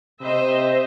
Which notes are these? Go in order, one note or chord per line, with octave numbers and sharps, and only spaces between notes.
C3 C5 D#5 E5